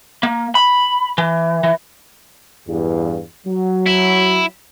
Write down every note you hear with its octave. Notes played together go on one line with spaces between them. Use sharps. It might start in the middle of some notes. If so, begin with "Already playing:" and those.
A#3
B5
E3
E3
E2 G2
F#3
E4